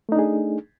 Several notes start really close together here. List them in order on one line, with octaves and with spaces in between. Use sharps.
A3 D#4 D4 G#4